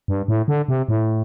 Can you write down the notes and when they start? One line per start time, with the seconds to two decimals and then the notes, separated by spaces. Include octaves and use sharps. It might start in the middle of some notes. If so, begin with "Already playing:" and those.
0.08 G2
0.28 A2
0.48 D3
0.68 C3
0.88 A2